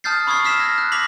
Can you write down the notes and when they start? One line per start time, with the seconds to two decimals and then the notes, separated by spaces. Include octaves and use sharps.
0.04 A5 D#6 F6 G6 A6 C7
0.27 B5 C#6 D#6 E6 G#6 C7
0.44 E6 F6 B6 C7 E7
0.60 F6 G#6 A#6
0.78 F#6
0.92 D6 E6 A#6 B6 F7 F#7